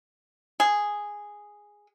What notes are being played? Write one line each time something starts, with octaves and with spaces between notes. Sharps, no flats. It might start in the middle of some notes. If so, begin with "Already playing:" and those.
G#4